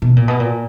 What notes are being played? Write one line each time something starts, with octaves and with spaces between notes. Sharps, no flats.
B2
A#2
B2
A#2